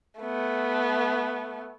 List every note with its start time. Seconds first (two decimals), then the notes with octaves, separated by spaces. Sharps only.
0.20 A3 B3